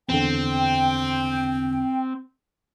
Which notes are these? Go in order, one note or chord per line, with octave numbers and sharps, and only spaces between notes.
E2 D3 C4 G5